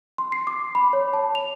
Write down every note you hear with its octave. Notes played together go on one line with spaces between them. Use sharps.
C6
C7
D6
B5
C#5
A5
F7